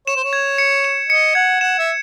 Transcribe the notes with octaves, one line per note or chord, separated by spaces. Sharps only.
C#5 E7
C5
C#5
G#6
C#7
E7
D#5 C#7
F#5 G#6
F#5 E7
E5